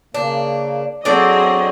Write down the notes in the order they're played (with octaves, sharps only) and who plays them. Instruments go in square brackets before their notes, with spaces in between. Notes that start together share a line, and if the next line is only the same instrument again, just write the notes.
[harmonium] C#3 A#3 [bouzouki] D4
[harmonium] F#3 F#4 [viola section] C4 G#4 D#5 [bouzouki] D4 A4 D5